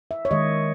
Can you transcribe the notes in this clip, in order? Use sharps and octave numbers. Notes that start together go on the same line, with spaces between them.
E5
C#5
D#3 G#3 D#5